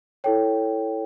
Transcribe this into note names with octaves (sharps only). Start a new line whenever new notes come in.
E4 A4 C#5 G5